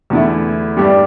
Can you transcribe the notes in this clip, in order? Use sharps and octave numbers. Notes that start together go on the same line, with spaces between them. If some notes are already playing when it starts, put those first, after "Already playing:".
E2 D3 A3 E4
G2 G3 D4 G4